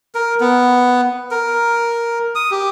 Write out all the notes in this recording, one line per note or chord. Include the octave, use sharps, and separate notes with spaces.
A#4
B3
A#4
D#6
G4